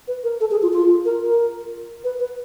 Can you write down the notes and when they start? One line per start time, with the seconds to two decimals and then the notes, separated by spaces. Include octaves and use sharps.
0.08 B4
0.24 A#4
0.40 A4
0.51 G#4
0.62 F4
0.73 F4
1.05 A#4
1.22 A#4
2.04 B4
2.20 B4